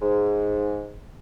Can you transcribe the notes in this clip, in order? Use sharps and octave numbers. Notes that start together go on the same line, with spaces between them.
G#2